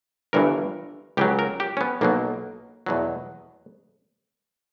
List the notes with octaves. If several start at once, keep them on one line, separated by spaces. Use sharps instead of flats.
G1 G2 E3 A#4
C#2 C#3 F#3 G4
A#4
G4
C#4
B3
B1 B2 F#3 A#3
E2 B2 F#3